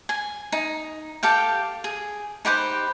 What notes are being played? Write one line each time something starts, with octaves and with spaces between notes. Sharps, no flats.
G#5
D#4
G4 A4 F5 G5
G#4
D#4 G4 B4 C5